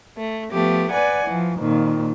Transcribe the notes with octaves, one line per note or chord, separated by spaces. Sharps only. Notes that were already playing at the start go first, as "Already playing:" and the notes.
A3
F3 A3 B3 G4
B4 D5 F#5 G#5
E3 F3
F2 A#2 D#3